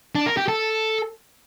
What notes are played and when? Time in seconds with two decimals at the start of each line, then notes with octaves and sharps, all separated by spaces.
0.15 D4
0.26 A#4
0.37 G4
0.48 A4